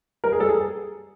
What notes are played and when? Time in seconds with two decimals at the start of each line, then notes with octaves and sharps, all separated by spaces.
0.24 G3 A#4
0.32 G#4
0.40 G3 A4
0.49 G#4